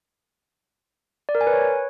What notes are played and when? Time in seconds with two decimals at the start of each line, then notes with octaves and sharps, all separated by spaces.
1.29 D5
1.35 A#4
1.41 G#5
1.47 B4
1.53 C#5